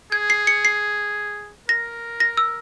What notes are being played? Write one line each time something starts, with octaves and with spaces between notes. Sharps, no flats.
G#4 G#6
C7
C#7
C7
A#4 A#6
A#6
E6